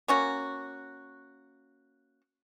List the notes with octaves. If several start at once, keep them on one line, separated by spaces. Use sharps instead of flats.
A#3 C#4 F#4